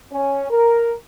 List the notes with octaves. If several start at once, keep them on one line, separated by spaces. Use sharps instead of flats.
C#4
A#4